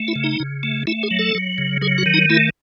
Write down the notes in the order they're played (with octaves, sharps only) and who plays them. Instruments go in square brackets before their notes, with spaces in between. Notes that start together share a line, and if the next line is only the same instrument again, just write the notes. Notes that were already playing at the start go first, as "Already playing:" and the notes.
Already playing: [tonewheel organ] A3
E4
C#3
D#4
C#3
A3
A3 E4
G#4
F#3
A4
F#3
C#3
F#3 G#4
F#4
D#3
D#4
A3 E4